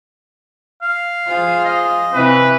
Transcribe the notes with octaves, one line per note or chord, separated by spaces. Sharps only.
F5
F3 F4 G#4 C5
D#5
C3 E3 C4 E4 B4